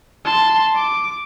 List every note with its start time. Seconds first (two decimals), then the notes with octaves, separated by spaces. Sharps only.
0.25 A5 C6
0.76 D6